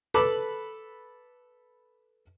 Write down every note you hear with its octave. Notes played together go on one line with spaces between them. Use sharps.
A4 B4 A5 B5 D6